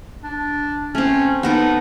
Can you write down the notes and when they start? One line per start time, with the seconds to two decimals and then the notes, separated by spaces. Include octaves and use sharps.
0.24 D4
0.95 A3 C4 C#4
1.43 B3 D#4 A4 A#4